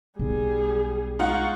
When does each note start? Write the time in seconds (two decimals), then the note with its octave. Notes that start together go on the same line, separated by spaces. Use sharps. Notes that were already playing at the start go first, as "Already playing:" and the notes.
0.19 B1 G3 G#4
1.19 G#3 D#4 F4 F#5 C#6